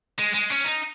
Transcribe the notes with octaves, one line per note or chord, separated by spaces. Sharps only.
G#3
G#3
C#4
D#4